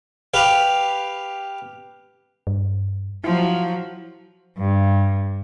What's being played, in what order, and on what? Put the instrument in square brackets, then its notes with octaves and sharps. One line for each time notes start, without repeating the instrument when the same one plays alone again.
[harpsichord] G4 B4 F5
[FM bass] G2
[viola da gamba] F3 F#3 [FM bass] E4
[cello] G2